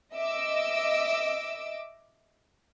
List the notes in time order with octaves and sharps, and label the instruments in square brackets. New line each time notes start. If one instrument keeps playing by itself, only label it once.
[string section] D#5 E5 D6 E6